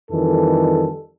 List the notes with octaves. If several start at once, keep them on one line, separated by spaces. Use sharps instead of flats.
F2 D#3 E3 G3 A4